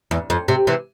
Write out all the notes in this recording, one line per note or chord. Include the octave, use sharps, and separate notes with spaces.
E2
F2
C3
C3 E3